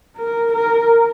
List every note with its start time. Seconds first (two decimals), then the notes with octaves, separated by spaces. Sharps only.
0.17 A#4
0.53 A#4